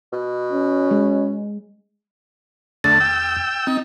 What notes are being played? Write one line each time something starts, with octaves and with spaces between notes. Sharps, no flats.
B2
C#4
G#3
E2 D3 A3 A6
G5 E6
C4 D#4